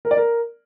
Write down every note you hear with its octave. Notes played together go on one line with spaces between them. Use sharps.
A#4
D5
A#4